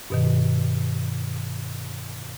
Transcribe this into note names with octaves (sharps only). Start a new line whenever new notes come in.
G2 B2 D#3